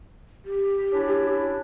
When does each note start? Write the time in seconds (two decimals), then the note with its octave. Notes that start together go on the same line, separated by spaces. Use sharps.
0.45 G4
0.92 C#4 D4 E4